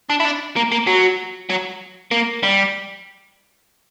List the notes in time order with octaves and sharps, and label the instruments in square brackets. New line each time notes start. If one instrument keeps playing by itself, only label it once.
[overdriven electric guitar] D4
E4
D4
A#3
A#3
F#3
F#3
A#3
G3